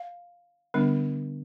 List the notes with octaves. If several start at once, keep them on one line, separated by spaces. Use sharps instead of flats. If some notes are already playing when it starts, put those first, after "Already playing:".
Already playing: F5
D3 G3 B3 D4